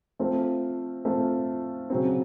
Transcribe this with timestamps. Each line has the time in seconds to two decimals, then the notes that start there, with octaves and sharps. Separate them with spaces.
0.19 F3 A3 C4 F4
1.05 F3 A3 C4 F4
1.90 C#3 F#3 C4